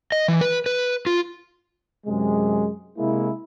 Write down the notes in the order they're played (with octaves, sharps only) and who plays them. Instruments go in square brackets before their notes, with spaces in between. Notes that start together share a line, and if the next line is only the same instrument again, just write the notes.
[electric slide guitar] D#5
E3
B4
B4
F4
[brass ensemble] F#2 C3 G#3
C3 G#3 A#3 E4